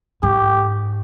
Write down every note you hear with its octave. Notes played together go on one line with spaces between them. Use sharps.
G#2 G4